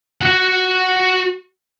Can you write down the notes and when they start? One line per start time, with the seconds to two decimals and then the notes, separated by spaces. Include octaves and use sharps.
0.21 F#4 F#5